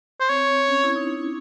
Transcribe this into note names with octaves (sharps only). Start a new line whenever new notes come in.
C5
C4 C#5
C#4
E4
D#4
D4